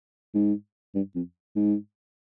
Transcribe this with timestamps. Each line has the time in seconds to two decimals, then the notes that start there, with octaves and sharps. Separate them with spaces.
0.34 G#2
0.95 G2
1.15 F2
1.56 G#2